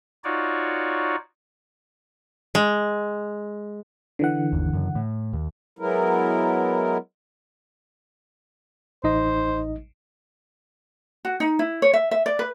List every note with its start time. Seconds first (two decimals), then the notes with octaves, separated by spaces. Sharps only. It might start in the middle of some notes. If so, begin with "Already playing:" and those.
0.24 D#4 F4 F#4 C#5 D5
2.55 G#3
4.19 D3 E3 F#5
4.53 G1 D#2
4.73 F#2 C#3
4.95 A2
5.33 D#2
5.79 F#3 G#3 B3 E4 A#4
9.04 A1 D#4 C5 D#5
11.25 F#4
11.40 D#4
11.59 E4
11.82 C#5
11.93 E5
12.11 E5
12.26 D5
12.39 B4